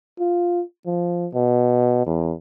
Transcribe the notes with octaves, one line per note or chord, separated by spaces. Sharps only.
F4
F3
B2
E2